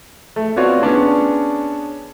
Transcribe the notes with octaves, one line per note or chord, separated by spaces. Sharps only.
A3
B3 C4 F4 F#4 C#5 D5
B3 C#4 D4 G#4